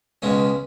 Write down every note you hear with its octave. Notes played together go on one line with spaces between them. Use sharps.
C#2 B2 G#3 C#4